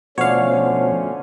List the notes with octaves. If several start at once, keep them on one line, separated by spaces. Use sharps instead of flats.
B2 D3 F3 A3 C#4 C#5 F5